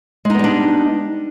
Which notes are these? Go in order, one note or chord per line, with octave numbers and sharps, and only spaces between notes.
G3 G#3 B3 D4 D#4